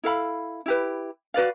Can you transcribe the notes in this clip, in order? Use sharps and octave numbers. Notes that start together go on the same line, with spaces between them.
E4 A4 F5 B5
E4 G4 B4
F#4 B4 D5 F5